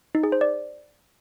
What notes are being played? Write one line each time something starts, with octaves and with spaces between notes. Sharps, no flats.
D#4
G#4
C5
D5